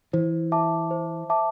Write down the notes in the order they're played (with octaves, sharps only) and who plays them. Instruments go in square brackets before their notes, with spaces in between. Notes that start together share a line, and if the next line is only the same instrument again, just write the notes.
[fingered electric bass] E3 [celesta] C5
[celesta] E5 A5 D6
C5
E5 A5 D6